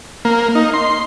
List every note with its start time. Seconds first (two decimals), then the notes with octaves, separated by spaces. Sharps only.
0.25 A#3
0.55 D#4
0.73 C6